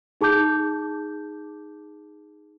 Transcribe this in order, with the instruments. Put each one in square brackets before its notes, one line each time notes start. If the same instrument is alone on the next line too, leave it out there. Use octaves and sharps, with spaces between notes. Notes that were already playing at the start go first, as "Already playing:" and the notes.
[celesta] D#4 G#4 A5 D6 G6